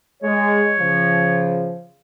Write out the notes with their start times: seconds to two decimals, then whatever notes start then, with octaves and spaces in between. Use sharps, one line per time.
0.23 G#3 C#5
0.78 C#3 F3